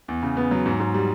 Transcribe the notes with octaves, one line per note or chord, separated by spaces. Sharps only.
E2
C#3
B3
F#3
G#2
G#2
G3